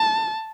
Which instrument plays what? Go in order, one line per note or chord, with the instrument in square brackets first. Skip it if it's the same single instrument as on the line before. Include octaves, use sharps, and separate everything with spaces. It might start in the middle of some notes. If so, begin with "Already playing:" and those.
Already playing: [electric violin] A5